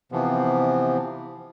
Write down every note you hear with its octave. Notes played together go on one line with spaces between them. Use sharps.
C3 E3 F3 B3